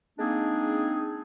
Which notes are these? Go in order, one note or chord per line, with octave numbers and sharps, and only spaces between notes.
G#3 A#3 C4 D4 D#4 G#4